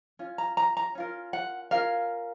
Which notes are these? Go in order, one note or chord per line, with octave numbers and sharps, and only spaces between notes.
C#4 F4
A#5
A#5
A#5
C#4 F4 A#4
F#5
C#4 F4 A#4 F5